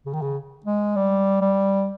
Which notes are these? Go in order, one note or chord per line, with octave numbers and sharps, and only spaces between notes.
C#3
D#3
C#3
G#3
G3
G3